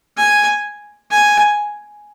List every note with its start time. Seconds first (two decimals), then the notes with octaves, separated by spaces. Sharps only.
0.17 G#5
1.11 G#5